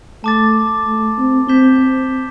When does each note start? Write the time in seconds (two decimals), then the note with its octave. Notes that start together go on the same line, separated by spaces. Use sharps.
0.24 A3 A5 D6 A6
0.87 A3
1.18 C4
1.48 C4 G6 B6 E7 G7